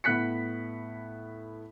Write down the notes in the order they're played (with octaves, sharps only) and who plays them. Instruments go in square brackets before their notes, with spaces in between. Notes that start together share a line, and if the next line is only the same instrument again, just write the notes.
[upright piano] A2 B3 F#6 B6 C#7